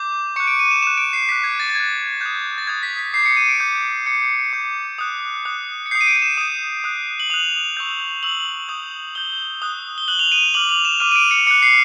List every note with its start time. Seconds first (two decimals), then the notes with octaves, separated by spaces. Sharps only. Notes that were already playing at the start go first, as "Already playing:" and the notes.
Already playing: D6 G6
0.36 C#6 C#7
0.40 F#6
0.47 D7
0.59 D#7
0.71 E7
0.82 C#6 F#6 E7
0.98 D7
1.13 C7
1.29 D6 B6
1.32 F#6
1.44 G#6
1.60 A6
1.70 A6
1.75 D6 F#6 G#6
2.21 D#6 F#6 G6
2.58 A6
2.67 D#6 F#6 G#6
2.83 B6
2.99 B6
3.14 D6 G6 C7
3.26 C#7
3.37 D#7
3.49 D7
3.60 D6 G6
4.06 D6 G6 C#7
4.53 D6 G6
4.98 D#6 F#6
5.45 D#6 F#6
5.86 C#7
5.91 D#6 G6 C7
6.01 D#7
6.07 D7
6.16 D#7
6.22 E7
6.38 D#6 G6
6.84 D#6 F#6
7.20 F#7
7.30 D#6 F#6 F7
7.77 C#6 E6 G6
8.23 C#6 E6 G6 F#7
8.69 D#6 G6
9.15 D#6 G6 G7
9.62 D#6 F#6
9.98 G7
10.08 D#6 F#6 F#7
10.19 F7
10.32 D#7
10.54 D6 F6 F#7
10.69 F7
10.85 E7
11.00 D6 F6 D#7
11.12 D#7
11.16 D7
11.31 C#7
11.47 D6 C#7
11.51 F#6
11.62 C7